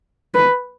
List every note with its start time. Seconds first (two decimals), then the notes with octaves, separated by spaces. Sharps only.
0.34 B4